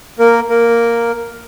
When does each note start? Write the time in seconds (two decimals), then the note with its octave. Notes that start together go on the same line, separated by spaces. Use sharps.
0.19 A#3 A#4
0.48 A#3 A#4